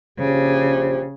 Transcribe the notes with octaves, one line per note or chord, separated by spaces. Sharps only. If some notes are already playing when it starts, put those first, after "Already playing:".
A#1 C#3 G4 C5